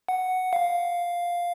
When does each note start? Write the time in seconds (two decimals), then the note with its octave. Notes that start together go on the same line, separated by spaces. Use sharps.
0.09 F#5
0.53 F5